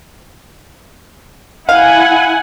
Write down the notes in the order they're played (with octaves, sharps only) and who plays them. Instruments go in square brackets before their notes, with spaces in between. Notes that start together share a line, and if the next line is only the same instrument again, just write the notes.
[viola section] E4 F#5 G#5 [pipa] F5